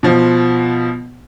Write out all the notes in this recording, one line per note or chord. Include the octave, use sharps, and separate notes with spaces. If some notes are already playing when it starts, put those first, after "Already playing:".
B2 F3